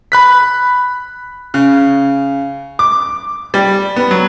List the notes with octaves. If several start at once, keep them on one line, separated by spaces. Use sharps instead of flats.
B5 F#6 B6
C#3
D6
G3
B3
F#3